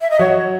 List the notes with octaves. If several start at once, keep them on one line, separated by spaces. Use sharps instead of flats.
E5
D#5
F#3 F#4 C#5